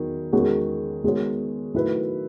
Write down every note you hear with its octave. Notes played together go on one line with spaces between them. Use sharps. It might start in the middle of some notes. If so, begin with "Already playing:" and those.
Already playing: E2 D#3 F#3
E2 D#3 G#3 C#4 F#4
D#3 G#3 B3 F#4 C#5
D#3 F#3 A3 E4 B4